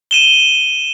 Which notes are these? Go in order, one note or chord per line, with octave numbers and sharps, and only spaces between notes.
D#7 E7 G7